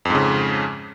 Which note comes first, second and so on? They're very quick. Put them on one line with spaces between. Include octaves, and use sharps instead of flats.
F2 G#2 C#3